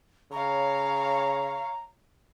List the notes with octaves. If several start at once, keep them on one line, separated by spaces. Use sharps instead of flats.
C#3 C#5 F5 A#5